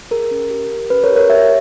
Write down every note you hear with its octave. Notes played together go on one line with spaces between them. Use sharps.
G#4 A#4
C#4
G4
G4
C#4 B4
A#4 C#5
G4
A#4 C#5
G4 C#5 E5